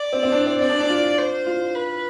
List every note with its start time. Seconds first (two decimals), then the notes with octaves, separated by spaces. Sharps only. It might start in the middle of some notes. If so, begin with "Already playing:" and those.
Already playing: D5
0.12 C4
0.23 C4
0.32 D4
0.46 C4
0.60 C4 D5
0.70 D4
0.80 D4
0.89 F4
1.18 C5
1.46 F4
1.75 B4